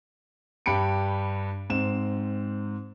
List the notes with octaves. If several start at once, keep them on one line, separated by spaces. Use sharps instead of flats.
G2 G4 B5 C#7 D7
G#2 C4 E7